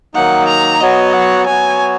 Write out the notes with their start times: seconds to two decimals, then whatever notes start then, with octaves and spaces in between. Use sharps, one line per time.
0.14 D#3 F#3 A#3 D#4 F#5
0.48 A#5
0.80 F#3 B3 F#4 C#5 D#5
1.13 F#5
1.46 F#3 B3 F#4 C#5 G#5